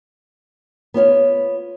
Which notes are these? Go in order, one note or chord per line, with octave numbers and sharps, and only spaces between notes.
B3 F4 C#5 F5